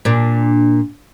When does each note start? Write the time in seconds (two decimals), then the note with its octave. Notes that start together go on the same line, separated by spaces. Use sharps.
0.05 A#2 D4